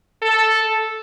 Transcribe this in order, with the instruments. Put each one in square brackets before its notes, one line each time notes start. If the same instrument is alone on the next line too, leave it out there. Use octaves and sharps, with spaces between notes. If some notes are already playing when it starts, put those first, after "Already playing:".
[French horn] A4